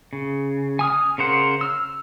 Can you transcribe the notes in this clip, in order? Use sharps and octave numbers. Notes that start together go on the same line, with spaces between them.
C#3
G#5 D#6 F6
C#3 A#4 C5 F#5
E6 F6